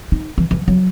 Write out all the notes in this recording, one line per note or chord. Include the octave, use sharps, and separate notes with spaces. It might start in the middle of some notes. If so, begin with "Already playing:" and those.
D#4
E3
E3
F#3